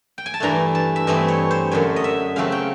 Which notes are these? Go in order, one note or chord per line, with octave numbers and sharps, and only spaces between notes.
G5
G#5
A5
G2 E3 A3 D4 A#5
A5
E5
G2 E3 A3 C4 D#5
C#5
C5
F#2 D3 F#3 C#5
D#5
E5
C#3 F#3 A3 C4 F5
G5